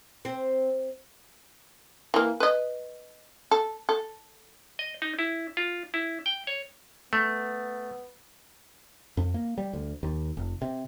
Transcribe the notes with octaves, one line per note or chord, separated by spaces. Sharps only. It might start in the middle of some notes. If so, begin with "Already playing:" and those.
C4
E3 A#3
B4 D#5
A4
A4
D#5
D#4
E4
F4
E4
G5
C#5
A3 B3
F2
A#3
G3
D2
D#2
F1
C3